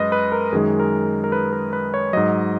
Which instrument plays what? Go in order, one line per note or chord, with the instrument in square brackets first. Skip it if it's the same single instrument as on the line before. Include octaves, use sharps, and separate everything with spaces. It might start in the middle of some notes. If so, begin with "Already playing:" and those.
Already playing: [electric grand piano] F#2 G#3 B4 D#5
B4
A#4
F#2 D#3 G#3 G#4
A#4
A#4
B4
A#4
B4
C#5
G#2 F#3 D#5